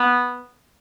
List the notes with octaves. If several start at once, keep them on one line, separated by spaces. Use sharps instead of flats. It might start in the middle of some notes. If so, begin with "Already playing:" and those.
Already playing: B3